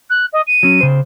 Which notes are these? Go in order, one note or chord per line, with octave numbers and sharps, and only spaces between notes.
F#6
D#5
D#7
F#3 C#4
C#3 C5